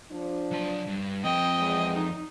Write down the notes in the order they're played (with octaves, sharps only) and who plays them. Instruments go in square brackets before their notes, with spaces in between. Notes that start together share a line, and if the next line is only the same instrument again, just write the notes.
[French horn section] F3 D4
[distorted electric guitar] F#3 A5
G2
[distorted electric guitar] F2 C4 [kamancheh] D#5 G5
[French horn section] E2 G#3
[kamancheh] D#4